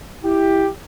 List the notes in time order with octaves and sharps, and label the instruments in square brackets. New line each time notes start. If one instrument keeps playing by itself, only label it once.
[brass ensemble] E4 G4